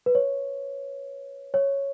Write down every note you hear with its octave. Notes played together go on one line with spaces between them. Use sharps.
B4
C#5
C#5